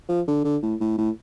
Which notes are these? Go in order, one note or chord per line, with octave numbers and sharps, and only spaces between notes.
F3
D3
D3
A2
A2
A2